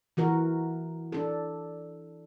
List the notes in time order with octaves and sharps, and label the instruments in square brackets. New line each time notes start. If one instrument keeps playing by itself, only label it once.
[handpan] E3 F#4 A#4
D4 A4